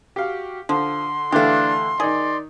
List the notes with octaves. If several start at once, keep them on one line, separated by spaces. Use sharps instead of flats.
F#4 G4 F5
D3 F3 C6
D3 E3 A3 D4 G4 F5
D#3 D#4 G#4 D5